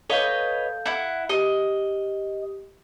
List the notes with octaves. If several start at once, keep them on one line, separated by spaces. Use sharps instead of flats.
A4 B4 C#5 D#5 F5 G6
E4 F#5
G4 D#5